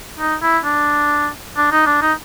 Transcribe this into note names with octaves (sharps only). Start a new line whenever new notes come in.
D#4
E4
D4
D4
D#4
D4
D#4